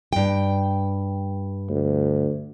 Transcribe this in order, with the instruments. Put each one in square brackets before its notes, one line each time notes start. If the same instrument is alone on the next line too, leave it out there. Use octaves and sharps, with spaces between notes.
[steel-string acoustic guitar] G2 G5
[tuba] D2